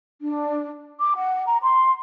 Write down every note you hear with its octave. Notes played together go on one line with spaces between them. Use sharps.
D4
D6
F#5
A#5
C6